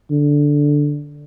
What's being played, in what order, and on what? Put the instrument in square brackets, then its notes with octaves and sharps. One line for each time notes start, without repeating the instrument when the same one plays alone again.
[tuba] D3